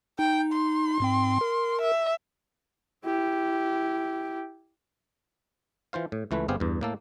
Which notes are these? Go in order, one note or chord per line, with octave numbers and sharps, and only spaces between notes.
D#4 G5
C6
G#2 C4 G5
A#4
E5
E4 G4
E3 F4 C5 F5
A2
C#2 E3 A3 B4
G1 B3 C4 G4 G#4 F5
E2 G2
A2 A#3 A4